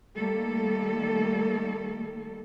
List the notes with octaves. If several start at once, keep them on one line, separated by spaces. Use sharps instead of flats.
D#3 G3 A3 A#3 A4